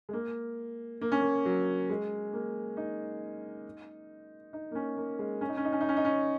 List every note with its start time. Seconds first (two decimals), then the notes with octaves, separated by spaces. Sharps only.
0.09 G#3
0.13 A#3
1.01 A#3
1.12 C#4
1.21 A#3
1.46 F#3
1.90 G#3
2.33 A#3
2.77 D#4
4.53 D#4
4.71 A#3
4.75 C#4
4.97 A#3
5.19 G#3
5.41 C#4
5.49 D#4
5.57 C#4
5.65 D#4
5.72 C#4
5.81 D#4
5.89 C#4
5.97 D#4
6.05 C#4